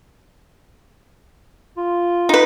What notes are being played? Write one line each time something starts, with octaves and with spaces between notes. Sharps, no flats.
F4
D#4 B4